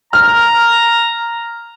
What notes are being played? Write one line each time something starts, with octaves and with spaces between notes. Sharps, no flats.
A#5 F6